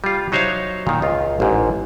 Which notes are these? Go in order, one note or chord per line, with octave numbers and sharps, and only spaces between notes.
G3 F4
F#3 D#4 C5 C#5 E5 F5
A#2 D#3
C#2 F4
A1 G#2